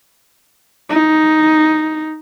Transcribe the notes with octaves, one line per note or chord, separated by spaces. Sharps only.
D#4